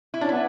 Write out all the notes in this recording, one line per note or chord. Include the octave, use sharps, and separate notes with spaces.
E4
C#4 D4
B3 E4